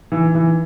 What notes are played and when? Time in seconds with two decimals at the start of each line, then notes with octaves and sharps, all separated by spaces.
0.12 E3
0.35 E3